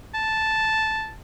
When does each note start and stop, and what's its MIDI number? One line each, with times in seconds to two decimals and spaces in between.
0.14 1.11 81